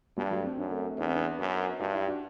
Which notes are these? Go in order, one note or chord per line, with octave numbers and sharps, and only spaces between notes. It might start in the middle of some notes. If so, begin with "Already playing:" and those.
G2 G3
F#3 A3
C4
F#2 D4
A3 C4
E2 D4
C4
B3 D4
F#2
G2 D4 F#4
E4 G4
D4 F#4